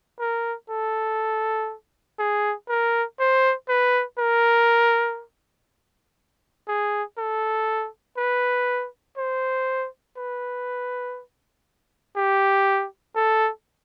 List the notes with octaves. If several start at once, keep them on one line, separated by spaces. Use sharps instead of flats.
A#4
A4
G#4
A#4
C5
B4
A#4
G#4
A4
B4
C5
B4
G4
A4